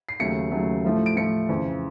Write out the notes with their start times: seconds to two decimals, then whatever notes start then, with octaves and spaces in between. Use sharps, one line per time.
0.09 C7
0.19 D#2 C#3 F#3 A3 C#7
0.51 D#2 C#3 F#3 A3
0.85 A2 F3 A3
1.06 D7
1.16 A2 F3 A3 C#7
1.49 F2 C#3 E3